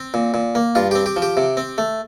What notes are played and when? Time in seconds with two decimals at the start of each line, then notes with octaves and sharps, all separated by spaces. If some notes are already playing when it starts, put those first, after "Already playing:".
Already playing: C4
0.14 A#2
0.34 A#2
0.55 A#3
0.75 G2 F4
0.91 C4 G4
1.06 G4
1.17 F3
1.22 G4
1.37 C3
1.57 C4
1.78 A3